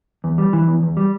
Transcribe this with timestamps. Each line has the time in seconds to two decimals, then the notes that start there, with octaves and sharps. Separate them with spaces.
0.24 E2
0.38 G3
0.53 E3
0.68 E2
0.83 E2
0.97 G3